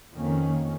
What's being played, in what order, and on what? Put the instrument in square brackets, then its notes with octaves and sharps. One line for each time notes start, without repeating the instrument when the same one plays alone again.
[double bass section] F2 D#3 A#3 C#4